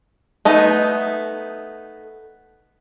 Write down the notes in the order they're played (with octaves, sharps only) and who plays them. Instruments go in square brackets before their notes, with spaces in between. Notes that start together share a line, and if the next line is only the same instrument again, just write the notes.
[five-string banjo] A3 B3 D#4